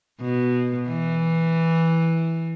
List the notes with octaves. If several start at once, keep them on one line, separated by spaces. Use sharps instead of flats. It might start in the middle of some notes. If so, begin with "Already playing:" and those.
B2
E3